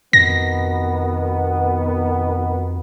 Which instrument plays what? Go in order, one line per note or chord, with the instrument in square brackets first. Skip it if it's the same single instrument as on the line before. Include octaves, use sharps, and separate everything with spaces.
[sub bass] F2 [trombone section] B2 D#3 B3 [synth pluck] A#6